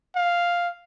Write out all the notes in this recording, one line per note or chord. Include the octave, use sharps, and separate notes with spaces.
F5